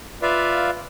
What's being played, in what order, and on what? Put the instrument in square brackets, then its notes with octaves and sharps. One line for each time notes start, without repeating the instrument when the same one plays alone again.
[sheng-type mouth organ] F4 B4 D5 E5 F5